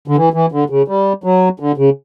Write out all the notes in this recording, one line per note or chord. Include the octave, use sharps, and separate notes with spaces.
D3
E3
E3
D3
C#3
G3
F#3
D3
C#3